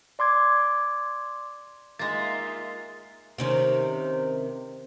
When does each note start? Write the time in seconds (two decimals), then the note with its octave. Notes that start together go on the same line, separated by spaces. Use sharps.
0.19 D5 C6 D6 G#6
1.99 G#3 A#3 D#4 F4 E5 A6
3.38 C3 D#3 C#4